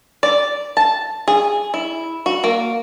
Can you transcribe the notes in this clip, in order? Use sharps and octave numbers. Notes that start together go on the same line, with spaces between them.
D5
A5
G#4
E4
F#4
A#3